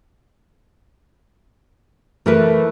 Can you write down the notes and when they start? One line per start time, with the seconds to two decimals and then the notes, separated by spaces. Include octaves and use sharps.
2.26 E3 A3 A#4 B4